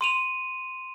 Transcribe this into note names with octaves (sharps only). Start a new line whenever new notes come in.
C6 D#7 F7